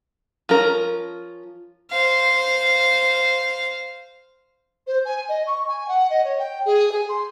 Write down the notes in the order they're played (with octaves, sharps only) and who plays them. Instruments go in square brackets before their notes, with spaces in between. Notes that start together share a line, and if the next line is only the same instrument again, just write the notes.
[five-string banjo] F3 C#4 A#4
[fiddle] C5 F5
[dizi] C5
G#5
D#5
C#6
G#5
F#5
D#5
C#5
G5
G#4
G#5
C6